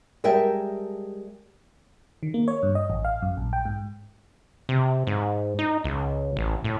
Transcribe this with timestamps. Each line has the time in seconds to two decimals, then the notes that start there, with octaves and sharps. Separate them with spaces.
0.24 G3 G#3 A#4 E5 G5 A5
2.23 D#3
2.34 A#3
2.48 C#5
2.63 G2
2.75 D#5
2.90 A1
3.05 F5
3.22 F#2
3.37 A#1
3.53 G5
3.65 G#2
4.69 C3
5.07 G#2
5.59 D#4
5.84 C#2
6.37 A1
6.64 A2